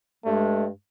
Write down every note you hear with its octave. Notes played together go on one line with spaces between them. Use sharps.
G2 G#3 A3